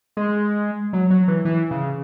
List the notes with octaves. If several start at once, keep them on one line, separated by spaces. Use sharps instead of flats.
G#3
F#3
F#3
E3
E3
C#3